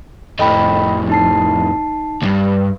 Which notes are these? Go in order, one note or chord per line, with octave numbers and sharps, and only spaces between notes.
F2 A2 D#5 G5 B5
D#4 A5 C7
D2 G2